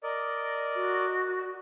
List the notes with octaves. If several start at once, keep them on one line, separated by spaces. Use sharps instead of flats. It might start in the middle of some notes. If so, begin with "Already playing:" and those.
A#4 D5 D#5
F#4